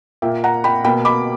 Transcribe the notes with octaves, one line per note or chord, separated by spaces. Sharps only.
A#2 A#3 E5 G5
F#5 A#5
G5 B5
B2 A#3 G5 B5
B5 D6